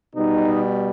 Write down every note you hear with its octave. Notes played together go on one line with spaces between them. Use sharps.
B2 G3 D#4